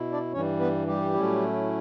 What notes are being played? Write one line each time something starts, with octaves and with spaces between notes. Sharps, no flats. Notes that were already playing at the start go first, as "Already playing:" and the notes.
Already playing: B2 E4
D4 D5
G2 E3 G3 C#4 C#5
B3 B4
G3 G4
A2 F#3 A3 C#4 E4